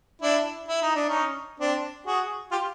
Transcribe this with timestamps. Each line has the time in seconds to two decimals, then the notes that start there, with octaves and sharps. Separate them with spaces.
0.22 D4 E4
0.68 E4
0.82 D#4
0.96 D4
1.08 C#4 D#4
1.59 C4 D4
2.06 F#4 G#4
2.51 F4 G4